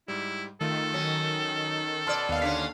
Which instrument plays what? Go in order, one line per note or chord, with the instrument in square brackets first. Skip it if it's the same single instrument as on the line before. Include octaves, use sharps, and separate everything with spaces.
[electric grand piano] G#2 G3 [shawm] E4
[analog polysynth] D#3 [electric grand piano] A3 F4 [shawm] A4
[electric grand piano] F#3 [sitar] C#4
[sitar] B2 D5 [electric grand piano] A5 C6 F6
[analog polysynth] D#2 F5 [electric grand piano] B3
[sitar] D3 C#4 [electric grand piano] D4 B6